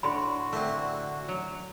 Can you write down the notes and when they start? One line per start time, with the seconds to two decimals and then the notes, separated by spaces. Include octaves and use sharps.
0.03 A2 D3 F#4 B5 C6
0.53 D3 A3 C4 E4
1.29 F#3